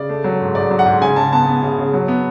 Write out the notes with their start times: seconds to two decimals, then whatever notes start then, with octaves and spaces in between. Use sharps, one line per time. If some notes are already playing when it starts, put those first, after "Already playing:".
Already playing: C#3 D5
0.09 A3
0.24 F#3
0.41 G#2
0.55 G#2 D5
0.71 F#3
0.79 F#5
0.86 G#2
1.02 C#3 G#5
1.16 C#3 A5
1.32 B3 A5
1.47 B3
1.63 C#3
1.78 C#3
1.93 F#3
2.08 B3